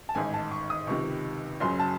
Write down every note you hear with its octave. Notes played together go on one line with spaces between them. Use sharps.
A5
A1 G#2 D#3 G#5
A5
C#6
D#6
C#2 C3 D#3 C#6
F#1 F#2 C#3 F#3 C6
A5